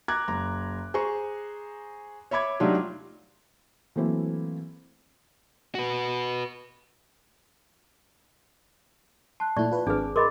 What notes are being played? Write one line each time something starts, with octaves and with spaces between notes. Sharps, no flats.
A#5 D6 F#6 G#6
F#1 A#5
G#4 C5 A#5 C#6
C#5 E5 B5 D6 G#6
F#3 A3 D4 D#4 F4 G4
E3 F#3 A3 A#3 C4 E4
F#4 B4
A5 C6 F#6
A#2 A3 E4 D5 C#6
F4 B4
G#1 C4 D4 G#4 B4 D6
G#4 A#4 D#5 B5 C6 D6